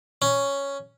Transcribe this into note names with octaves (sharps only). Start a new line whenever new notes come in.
C#4